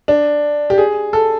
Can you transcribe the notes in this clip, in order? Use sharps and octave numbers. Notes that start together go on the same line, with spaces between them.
D4
G4
G#4
A4